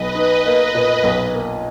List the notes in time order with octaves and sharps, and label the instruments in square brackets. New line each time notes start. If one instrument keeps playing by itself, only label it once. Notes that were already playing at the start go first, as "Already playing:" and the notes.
Already playing: [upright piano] B1 [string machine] B4 D#5
[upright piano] D#4
A#3
A#2
B1
A#3